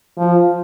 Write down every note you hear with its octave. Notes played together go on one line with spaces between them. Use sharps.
F3